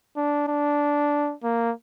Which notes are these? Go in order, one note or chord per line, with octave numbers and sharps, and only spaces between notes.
D4
D4
A#3